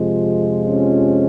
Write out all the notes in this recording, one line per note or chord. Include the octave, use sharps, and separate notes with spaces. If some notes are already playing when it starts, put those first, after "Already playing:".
Already playing: F2 C3 F3 G#3
C#4